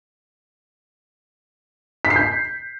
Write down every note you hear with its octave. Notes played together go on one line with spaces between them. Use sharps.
B6
C7
G6